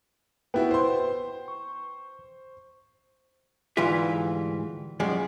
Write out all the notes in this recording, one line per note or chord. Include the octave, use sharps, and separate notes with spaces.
B3 E4 F#4 B4 G5
C5 C6
C#6
D2 G#2 E3 G3 F4 E5
F#2 F3 G3 G#3